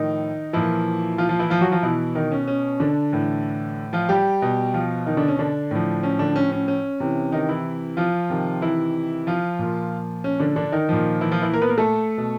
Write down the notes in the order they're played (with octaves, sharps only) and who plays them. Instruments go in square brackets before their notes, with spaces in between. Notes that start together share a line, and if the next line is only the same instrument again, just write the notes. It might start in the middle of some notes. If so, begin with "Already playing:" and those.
Already playing: [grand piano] A2 D#3 F3 D#4
A#2 E3 F3 E4
F3 F4
F3 F4
E3 E4
F3 F4
F#3 F#4
F3 F4
B2 E3 E4
D#3 D#4
C#4
C#4
D3 D4
A2 E3
F3 F4
G3 G4
B2
F3 F4
D#3 D#4
D3 D4
C#4
D3 D4
A2 F3
C#4
D3 D4
C#4
C#4
C#4
C3 E3
D#3 D#4
E3 E4
F3 F4
C3 D#3
E3 E4
F3 F4
A#2 F3
C#4
D3 D4
D3 D4
D#3 D#4
A#2 F3
E3 E4
F3 F4
E3 E4
A#3 A#4
B3 B4
A#3 A#4
A3 A4
B2